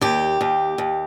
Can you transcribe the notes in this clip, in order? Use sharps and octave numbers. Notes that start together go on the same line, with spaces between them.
D#2 G4
D#2
D#2